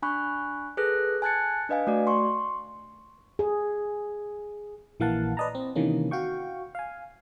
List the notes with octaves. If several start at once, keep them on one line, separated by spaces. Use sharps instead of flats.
D4 G#5 B5 C#6 F#6
G#4 A4 B4 F#6 A#6
G#5 A5 F#6 G#6 A6 C#7
D4 B4 D#5 F5 G#5
A3 F#4 D5
C6 C#6
G#4
A#1 E3 A#3 F5 F#5 A5
B4 D5 D#5 A5 A#5
C4
C3 D#3 E3 A#3 C#4
F#4 F5 G5 C#6
F5 G#5